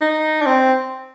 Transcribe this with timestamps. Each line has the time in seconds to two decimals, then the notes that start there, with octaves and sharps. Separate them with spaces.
0.01 D#4
0.41 D4
0.46 C4